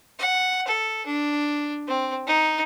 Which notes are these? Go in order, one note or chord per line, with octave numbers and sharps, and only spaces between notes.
F#5
A4
D4
C4
D#4